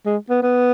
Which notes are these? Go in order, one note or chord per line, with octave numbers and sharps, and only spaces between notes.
G#3
B3
B3